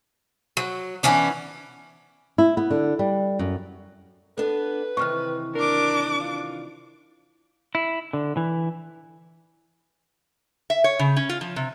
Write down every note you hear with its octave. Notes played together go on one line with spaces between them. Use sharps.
F#3
E3 B3 C#4 D4
E4
B3
D3
G3
F#2
B3 D4 A4 B4
C3 D#3 E3 C#6 F6
D4 A#4 D6
F4
E4
D3
E3
E5
C#5
C#3
C#4
F4
F3
C3